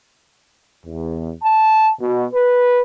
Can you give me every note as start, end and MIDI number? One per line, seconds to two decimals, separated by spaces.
0.86 1.31 40
1.43 1.90 81
2.01 2.25 47
2.34 2.81 71